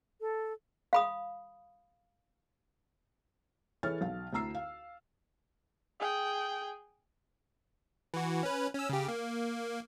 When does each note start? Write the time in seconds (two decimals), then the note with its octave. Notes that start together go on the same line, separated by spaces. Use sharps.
0.21 A4
0.93 F5 B5 D#6
3.83 E3 G#4 A4 C#5 F6 A6
4.01 B1 F5
4.33 D2 E4 A#5 E6 C7
4.55 F5
6.00 G#4 G5
8.14 E3 F#4
8.43 C#4 B4
8.75 C#4 E6
8.89 C#3 G4
9.08 A#3